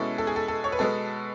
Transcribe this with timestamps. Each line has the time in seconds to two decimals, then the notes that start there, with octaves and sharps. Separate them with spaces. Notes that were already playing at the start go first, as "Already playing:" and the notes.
Already playing: B2 G#3 C#4 E4 A4
0.18 A4
0.27 G#4
0.36 A4
0.48 A4
0.64 C#5
0.72 B4
0.79 B2 G#3 B3 A4